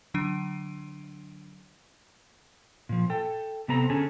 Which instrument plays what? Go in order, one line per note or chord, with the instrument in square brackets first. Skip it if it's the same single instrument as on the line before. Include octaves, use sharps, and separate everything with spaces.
[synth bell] D3 F#3 D4 D7 D#7
[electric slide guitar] A#2 F3
A4 G5
C3 B3 C4 A4 A#5
D3 C#4 G#4 A4